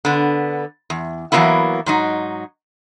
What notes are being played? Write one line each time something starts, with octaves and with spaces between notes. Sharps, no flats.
D3 B3
E2
E3 F#3 G3 A#3 B3 E4
G#2 F#3 D#4